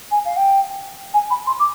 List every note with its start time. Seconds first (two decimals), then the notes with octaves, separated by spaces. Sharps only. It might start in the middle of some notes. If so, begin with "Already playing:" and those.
0.11 G#5
0.25 F5
0.36 G5
1.13 G#5
1.30 B5
1.46 C6
1.59 D6